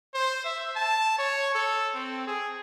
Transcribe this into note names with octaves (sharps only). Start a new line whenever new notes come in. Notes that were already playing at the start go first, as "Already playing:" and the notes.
C5
E5
A5
C#5
A4
C4
G#4